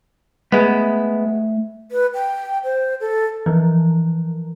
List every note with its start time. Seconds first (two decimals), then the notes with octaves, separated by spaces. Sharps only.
0.52 G#3 A3 B3 E5
1.92 B4
2.14 G5
2.64 C5
3.01 A4
3.46 E3 F3